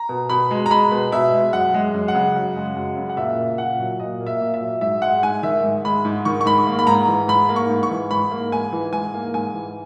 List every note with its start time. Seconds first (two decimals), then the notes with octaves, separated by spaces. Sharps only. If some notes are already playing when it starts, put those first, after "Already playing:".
Already playing: A#5
0.09 B2
0.30 B2 B5
0.51 G#3
0.66 A#5
0.70 G#3 B5
0.91 B2
1.12 B2 E5
1.33 G#3
1.52 F#2 F#5
1.74 G#3
1.94 F#2
2.08 F#5
2.15 C#3
2.35 F#2
2.56 G#3
2.76 F#2
2.97 C#3
3.09 F#5
3.17 A#2 E5
3.38 A#3
3.58 A#2 F#5
3.79 F#3
4.00 A#2 D#5
4.21 A#3
4.27 E5
4.41 A#2
4.54 E5
4.61 F#3
4.81 G#2 E5
5.02 G#3 F#5
5.23 G#2 G#5
5.43 D#3 E5
5.63 G#2
5.85 G#3 B5
6.05 G#2
6.25 D#3 C#6
6.41 C#6
6.46 G#2 B5
6.67 A#3
6.79 B5
6.87 G#2 A#5
7.08 E3
7.28 G#2 B5
7.49 A#3
7.56 C#6
7.69 G#2
7.83 C#6
7.91 E3
8.11 G#2 B5
8.31 A#3
8.52 G#2 G#5
8.72 E3
8.93 G#2 G#5
9.14 A#3
9.34 G#2 G#5
9.54 E3